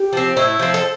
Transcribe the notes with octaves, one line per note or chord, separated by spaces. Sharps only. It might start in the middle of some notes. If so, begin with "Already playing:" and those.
Already playing: G4
F3 C4
A2 E4
F3 C4
A4